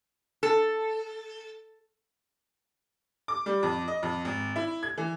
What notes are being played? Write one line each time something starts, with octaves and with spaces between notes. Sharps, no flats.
A4
D6
G3
F2
D#5
F2
G#1
E4
G#6
E3